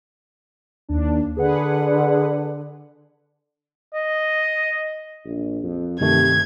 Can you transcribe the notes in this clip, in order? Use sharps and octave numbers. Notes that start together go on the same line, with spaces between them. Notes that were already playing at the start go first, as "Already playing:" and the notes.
D#2 D4
D3 G#4 B4 F#5
D#5
A#1
F2
G2 C3 D#3 A3 G#6